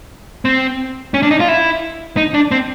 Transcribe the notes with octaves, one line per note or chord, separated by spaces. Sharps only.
C4
C#4
D4
D#4
F4
E4
D#4
D4
C4